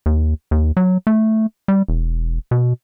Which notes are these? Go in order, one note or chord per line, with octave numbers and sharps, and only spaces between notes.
D#2
D#2
F#3
A3
G3
E1
B2